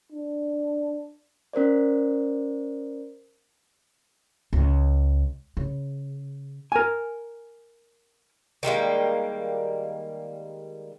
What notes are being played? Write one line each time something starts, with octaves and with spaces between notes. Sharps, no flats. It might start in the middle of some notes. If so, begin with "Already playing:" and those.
D4
C#4 A#4 C5 D5
C#2
C#3
A#4 G#5
D#3 G3 G#3 A#3